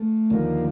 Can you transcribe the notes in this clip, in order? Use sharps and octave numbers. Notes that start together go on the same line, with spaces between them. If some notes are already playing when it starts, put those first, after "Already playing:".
Already playing: A3
D#2 D3 F3 A#3